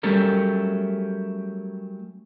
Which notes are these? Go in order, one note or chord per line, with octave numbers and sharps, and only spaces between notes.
F#3 G3 A3 C#4 G4 A#4